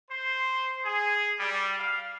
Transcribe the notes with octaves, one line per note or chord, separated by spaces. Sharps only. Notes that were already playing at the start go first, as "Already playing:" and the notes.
C5
G#4
G3
F5